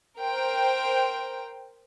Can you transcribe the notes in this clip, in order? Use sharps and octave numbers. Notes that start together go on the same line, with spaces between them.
A#4 C5 G5